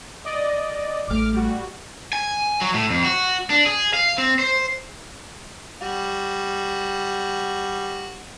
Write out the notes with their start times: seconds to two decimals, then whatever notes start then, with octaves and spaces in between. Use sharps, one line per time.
0.25 D5 D#5
1.08 A1 A3 D6 F6
1.32 G3 F#4
2.13 G#5
2.61 F#3
2.74 A2
2.90 F2
3.04 F#4
3.50 D4
3.66 G#4
3.94 F5
4.18 C4
4.39 C5
5.81 G3 F#4